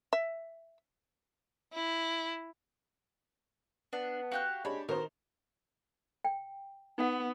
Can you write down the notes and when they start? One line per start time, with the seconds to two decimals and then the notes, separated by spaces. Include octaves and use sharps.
0.13 E5
1.73 E4
3.93 B3 D4
4.31 F#4 G4 F5 F#6
4.65 G#3 D4 G4 C#5 B5
4.89 B2 D#3 A#4 C5
6.25 G5
6.98 B3 D#4 F#5